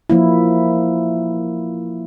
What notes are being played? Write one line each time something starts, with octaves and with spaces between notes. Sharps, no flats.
F3 A#3 E4